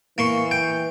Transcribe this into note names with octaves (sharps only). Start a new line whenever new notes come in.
E3 A#3 C6 C#6
G5